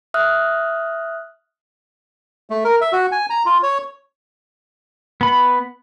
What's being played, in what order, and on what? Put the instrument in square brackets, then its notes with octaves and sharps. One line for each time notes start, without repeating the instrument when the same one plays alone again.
[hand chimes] E5 D#6 F6 F#6
[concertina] A3
A#4
E5
F#4
G#5
A#5
F4
C#5
[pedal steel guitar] B3 B5